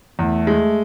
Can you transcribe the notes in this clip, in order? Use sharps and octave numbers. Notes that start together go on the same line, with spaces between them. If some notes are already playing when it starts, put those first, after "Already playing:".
E2 A3
G#3